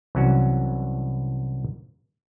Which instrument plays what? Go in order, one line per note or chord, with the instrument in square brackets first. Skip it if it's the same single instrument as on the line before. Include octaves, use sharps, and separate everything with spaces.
[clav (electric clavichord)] C2 E3 F#3 C#4 F#4